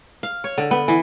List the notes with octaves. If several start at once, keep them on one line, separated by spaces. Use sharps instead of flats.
F5
C#5
D3
B3
E3